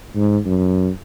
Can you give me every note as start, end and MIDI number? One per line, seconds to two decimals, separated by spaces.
0.16 0.38 44
0.46 0.89 42